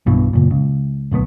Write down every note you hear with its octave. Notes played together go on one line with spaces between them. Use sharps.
B1 G2 B2 E3
F#1 A#2
C#2
D1 B1 A3 B3